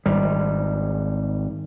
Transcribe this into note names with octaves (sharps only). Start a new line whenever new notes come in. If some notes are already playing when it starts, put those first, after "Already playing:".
G#1 G3